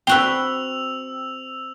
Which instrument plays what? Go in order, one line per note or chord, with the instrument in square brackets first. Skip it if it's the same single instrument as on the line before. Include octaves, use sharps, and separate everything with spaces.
[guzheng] C4 F#4 B4 [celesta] G5 G7 [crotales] E6 F7